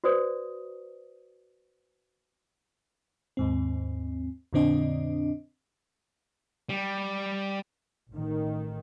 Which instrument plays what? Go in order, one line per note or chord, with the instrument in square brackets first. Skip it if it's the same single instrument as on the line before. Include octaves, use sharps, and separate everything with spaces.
[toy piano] F#4 B4 C5 D5 D#6
[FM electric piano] D#2 G#2 C4
F2 A#2 D3 C4 D4 D#5
[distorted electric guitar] G3
[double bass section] A1 D#3